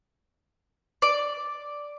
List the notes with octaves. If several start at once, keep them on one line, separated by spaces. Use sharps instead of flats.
D5